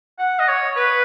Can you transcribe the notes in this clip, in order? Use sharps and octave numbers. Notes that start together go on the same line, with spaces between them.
F#5
D#5
C#5
B4